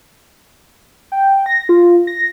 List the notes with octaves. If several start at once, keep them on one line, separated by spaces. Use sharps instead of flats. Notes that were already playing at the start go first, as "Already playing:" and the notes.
G5
A#6
F4
A#6